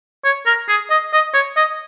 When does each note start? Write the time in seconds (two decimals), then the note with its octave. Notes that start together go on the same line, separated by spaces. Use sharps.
0.25 C#5
0.46 A#4
0.68 G#4
0.90 D#5
1.13 D#5
1.34 C#5
1.57 D#5